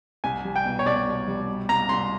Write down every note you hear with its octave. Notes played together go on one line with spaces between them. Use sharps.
C2 G#5
G3
G5
B2
C#5
C2 D5
C2
G3
B2
C2 A#5
C2 C6